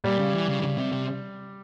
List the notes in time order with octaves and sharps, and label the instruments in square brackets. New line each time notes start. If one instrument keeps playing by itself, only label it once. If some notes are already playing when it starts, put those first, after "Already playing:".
[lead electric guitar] A#2 [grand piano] G3
[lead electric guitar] C#3
E3
C#3
E3
C#3
C3
C3